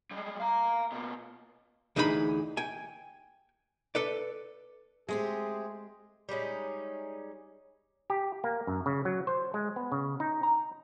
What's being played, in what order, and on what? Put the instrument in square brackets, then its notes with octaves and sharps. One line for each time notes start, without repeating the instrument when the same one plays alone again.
[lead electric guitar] G3 G#3
F5 A#5
B2 A#3
[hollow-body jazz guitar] D2 E3 D#4 G#4 B4 B5
G5 G#5
A4 B4 D5
[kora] G#3 [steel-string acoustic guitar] A3 C4 G4 [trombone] G#4
[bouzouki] G3 G#3 C#4 D#4
[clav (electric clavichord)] G4
A#3
F#2
C#3
F#3
C5
G#3
B3
C#3
D#4
A#5